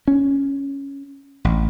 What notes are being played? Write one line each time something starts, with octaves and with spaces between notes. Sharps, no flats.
C#4
A1